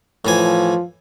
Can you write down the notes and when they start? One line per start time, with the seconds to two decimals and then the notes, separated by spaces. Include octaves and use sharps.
0.25 A2 E3 F3 G#5